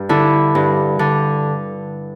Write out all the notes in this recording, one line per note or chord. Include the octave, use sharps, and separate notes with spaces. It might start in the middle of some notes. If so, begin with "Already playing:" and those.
Already playing: G2
D3 E4
G2
D3